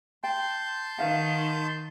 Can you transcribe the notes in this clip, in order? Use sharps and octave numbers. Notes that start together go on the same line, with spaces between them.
G5 A5 C6 G6
D#3 B4 F5 F#5